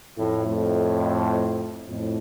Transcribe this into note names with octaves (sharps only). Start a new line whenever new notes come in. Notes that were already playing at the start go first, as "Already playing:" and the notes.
F2 A2
F2 A2
F2 A2